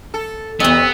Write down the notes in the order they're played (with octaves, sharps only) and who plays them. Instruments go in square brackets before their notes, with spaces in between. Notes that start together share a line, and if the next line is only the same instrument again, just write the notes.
[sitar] A4
[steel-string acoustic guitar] E2 D#5 [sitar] C3 [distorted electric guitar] B3 [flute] E6